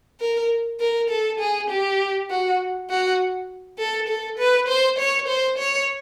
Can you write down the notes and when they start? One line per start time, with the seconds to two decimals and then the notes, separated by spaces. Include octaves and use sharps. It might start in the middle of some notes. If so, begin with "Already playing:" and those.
0.20 A#4
0.80 A#4
1.10 A4
1.40 G#4
1.70 G4
2.30 F#4
2.90 F#4
3.79 A4
4.08 A4
4.38 B4
4.68 C5
4.98 C#5
5.28 C5
5.58 C#5